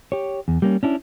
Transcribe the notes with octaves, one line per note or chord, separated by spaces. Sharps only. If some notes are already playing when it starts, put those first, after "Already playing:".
G4 C#5
E2
G3 A#3 C#4
C#4 D4 E4